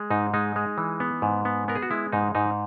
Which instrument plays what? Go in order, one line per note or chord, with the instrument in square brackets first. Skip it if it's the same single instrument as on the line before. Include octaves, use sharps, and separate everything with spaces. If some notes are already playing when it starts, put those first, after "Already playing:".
Already playing: [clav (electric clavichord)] G#3
G#2 D#4
G#3 D#4
G#3
E3
B3
G#2
B3
B3 A#4
G#4
F#4
G#3 E4
G#2 D#4
G#2 D#4